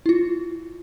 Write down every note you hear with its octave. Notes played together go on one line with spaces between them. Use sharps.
E4 F4